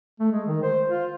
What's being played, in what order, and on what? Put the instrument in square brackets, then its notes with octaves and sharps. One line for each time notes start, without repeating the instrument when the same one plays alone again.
[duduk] A3
G#3
D#3
C5
F4